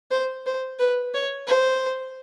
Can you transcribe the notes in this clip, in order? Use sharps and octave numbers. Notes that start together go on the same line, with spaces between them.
C5
C5
B4
C#5
C5